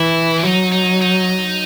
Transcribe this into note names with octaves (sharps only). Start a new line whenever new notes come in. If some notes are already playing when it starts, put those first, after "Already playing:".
Already playing: E3 E4
D4
F#3 D#4
D#4
D#4